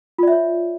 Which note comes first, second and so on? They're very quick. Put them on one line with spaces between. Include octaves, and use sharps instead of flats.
F4 D5 E5 C#5